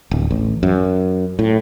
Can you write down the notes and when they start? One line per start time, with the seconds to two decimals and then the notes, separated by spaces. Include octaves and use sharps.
0.11 D1
0.31 A1
0.63 F#2
1.39 A2